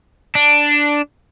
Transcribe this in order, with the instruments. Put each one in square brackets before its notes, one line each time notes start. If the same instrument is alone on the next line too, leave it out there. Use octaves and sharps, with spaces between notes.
[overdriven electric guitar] D4